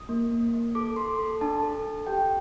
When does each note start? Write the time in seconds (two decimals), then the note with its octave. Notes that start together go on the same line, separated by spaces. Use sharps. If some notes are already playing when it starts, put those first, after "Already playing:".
Already playing: D#6
0.09 A#3
0.31 A#3
0.53 A#3
0.75 A4 D6
0.96 A4 C6
1.19 A4
1.41 D4 A5
1.63 A4
1.85 A4
2.07 G4 G5